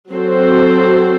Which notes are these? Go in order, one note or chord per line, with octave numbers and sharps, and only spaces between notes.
F#3 C4 F#4 A4 C5